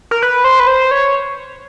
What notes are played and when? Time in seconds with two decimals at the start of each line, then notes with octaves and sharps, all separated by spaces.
0.11 A#4
0.22 B4
0.44 C5
0.60 B4
0.67 C5
0.91 C#5